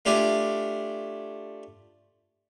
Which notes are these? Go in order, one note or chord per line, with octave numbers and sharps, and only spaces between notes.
A3 D4 F4 G4 D5 G#5